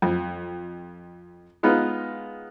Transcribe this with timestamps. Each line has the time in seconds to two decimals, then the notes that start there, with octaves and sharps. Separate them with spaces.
0.02 F2
1.63 G#3 B3 D#4 F4